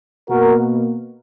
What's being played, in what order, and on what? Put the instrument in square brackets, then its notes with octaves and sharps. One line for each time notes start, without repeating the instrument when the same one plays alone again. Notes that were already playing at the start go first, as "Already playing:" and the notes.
[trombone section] B2 A#3 F#4 A#4